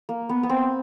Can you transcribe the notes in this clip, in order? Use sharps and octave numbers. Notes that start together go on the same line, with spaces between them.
A#3
B3
B3
C4